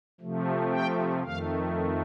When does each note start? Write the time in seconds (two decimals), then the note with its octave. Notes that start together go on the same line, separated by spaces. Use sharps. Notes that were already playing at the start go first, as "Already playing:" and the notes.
0.21 C3 F3 A3
0.72 G5
1.23 F2 D#3 A3 F5